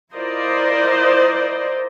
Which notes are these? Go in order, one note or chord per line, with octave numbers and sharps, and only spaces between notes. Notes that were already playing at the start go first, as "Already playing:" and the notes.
E4 F4 A#4 C5 D5 D#5